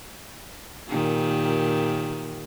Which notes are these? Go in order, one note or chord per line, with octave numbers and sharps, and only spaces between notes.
A#2 D#3 G4